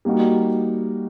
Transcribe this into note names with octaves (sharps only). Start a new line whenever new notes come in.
G3 A#3 D#4 F#4